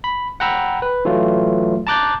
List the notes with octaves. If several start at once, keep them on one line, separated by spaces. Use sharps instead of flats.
B5
F#5 G5 A#5 B5 E6
B4
E3 F#3 A3 F4
A5 A#5 D6 F#6 G6 A6